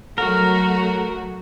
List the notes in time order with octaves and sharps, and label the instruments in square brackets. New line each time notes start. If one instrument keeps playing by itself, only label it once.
[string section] F#3 A3 F#4 [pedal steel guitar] A#4